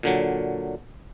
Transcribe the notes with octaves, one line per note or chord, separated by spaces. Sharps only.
A#2 D3 F#3